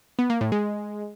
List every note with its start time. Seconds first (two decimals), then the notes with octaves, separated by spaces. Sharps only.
0.19 B3
0.30 A#3
0.41 A2
0.52 G#3